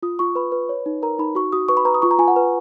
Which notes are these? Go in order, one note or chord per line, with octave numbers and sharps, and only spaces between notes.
F4 D#6
F4 C#6
B4 B5
B4
C#5
D#4
A#4 A#5
D#4 B5
F#4 C#6
F#4 D#6
B4 C#6
B5
B4 A#5
D#6
F4 C#6
A#5
F4 G#5
F#5
B4